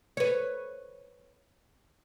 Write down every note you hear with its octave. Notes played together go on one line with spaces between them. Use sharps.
B4 C#5